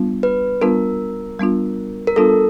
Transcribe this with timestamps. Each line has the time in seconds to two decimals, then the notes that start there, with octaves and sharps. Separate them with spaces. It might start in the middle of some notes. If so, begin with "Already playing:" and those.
Already playing: G3 B3 D4 F4
0.23 B4
0.61 G3 B3 D4 F4 A#4
1.39 G3 B3 D4 F4
2.07 A#4
2.16 G3 B3 D4 F4 A4